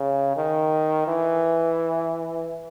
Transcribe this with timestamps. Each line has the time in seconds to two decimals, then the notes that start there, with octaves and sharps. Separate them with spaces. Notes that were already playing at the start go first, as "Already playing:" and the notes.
Already playing: C#3
0.37 D#3
1.07 E3